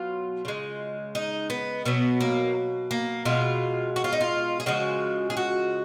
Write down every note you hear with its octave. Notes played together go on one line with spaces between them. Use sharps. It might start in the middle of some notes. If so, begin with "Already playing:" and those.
Already playing: B2 F#3 F4
C#3 G#3
D#4
B3
B2 F#3 B3
A#3
A#3
B2 G#3 F4
F#4
F4
D#4
F4
G#4
C#3 F3 G#3 F#4
G#4
F#4